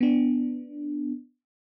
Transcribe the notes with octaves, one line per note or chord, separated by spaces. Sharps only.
B3 D4